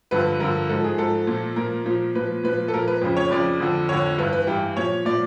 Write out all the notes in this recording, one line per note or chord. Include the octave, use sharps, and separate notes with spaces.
G2 D3 F3 B4
G2 D3 F3 A#4
G#2 F3 A4
G#4
G#2 F3 A4
A#2 F3
A#2 F3 A#4
A#2 F3
A#2 F3 B4
A#2 F3 B4
A4
A#2 F3 A#4
B4
F2 C#3 F3
C#5
F2 C#3 F3 D5
F2 D3 F3
F2 D3 F3 C#5
G2 E3 B4
B4
G2 E3 G4
A#2 F3 C#5
A#2 F3 D5